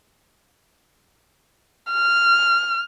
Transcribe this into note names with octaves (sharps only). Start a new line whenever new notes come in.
F6